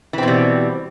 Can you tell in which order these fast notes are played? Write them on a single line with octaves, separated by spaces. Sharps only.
E3 C4 B2 G3